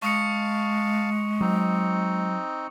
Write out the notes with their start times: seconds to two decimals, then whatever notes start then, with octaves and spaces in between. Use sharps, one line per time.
0.02 G#3 F5 A5 C#6 D#6 C#7
1.41 F#3 C4 D#4